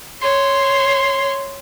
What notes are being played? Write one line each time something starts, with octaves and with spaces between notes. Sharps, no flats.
C#5 C6